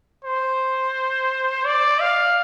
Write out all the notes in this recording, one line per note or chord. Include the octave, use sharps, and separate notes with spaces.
C5
D5
F5